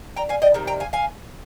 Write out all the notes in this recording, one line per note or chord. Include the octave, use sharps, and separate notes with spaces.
G5 A#5
F5 G#5
D#5 G5
C3 D#3 G3
G5 A#5
F5 G#5
F5 G#5